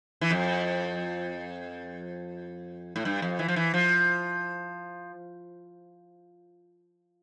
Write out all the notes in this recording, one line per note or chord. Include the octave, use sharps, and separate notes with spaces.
E3
F2
A2
G2
F2
E3
F3
E3
F3